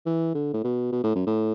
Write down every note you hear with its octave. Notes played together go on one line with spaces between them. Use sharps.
E3
D3
A2
B2
B2
A2
F#2
A2